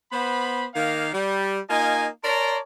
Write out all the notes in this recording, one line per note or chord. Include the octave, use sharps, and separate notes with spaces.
B3 C5 B5
D#3 A#3 F5
G3
A#3 D#4 F4 D#5 G#5
A#4 C#5 D5 A5 A#5 C6